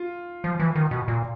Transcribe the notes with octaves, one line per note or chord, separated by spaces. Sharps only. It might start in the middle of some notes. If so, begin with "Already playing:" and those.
Already playing: F4
F3
E3
D#3
B2
A#2